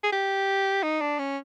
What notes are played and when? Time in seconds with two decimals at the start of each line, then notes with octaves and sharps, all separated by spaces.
0.04 G#4
0.12 G4
0.83 D#4
1.01 D4
1.19 C#4